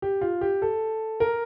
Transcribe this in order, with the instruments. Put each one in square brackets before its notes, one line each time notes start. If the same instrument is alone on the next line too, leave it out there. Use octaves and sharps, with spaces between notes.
[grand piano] G4
F4
G4
A4
A#4